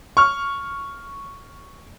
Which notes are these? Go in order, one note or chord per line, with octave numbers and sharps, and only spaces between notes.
C#6 F6